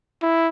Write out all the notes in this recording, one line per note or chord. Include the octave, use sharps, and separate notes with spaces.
E4